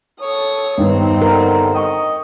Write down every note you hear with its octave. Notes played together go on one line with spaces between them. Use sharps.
A4 C#5 D#6
G2 D#3 B3 C4 D#4
D3 A#4
D#5 G5 C#6